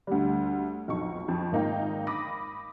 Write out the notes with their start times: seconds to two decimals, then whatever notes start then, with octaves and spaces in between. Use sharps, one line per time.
0.07 D2 G3
0.88 B1 F2 C#6
1.28 F2
1.52 G#1 A#3 D#4 F5 G5
2.07 B5 D6 D#6 A#6